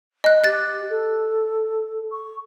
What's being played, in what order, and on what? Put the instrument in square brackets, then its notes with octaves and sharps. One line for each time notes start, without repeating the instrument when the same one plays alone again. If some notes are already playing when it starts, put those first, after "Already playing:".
[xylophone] D#5 F#6
[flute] G4 [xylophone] F#6 A6
[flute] A4
C#6